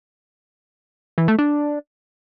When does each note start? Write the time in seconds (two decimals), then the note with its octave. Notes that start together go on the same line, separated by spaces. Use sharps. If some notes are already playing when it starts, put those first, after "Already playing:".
1.18 E3
1.28 A3
1.39 D4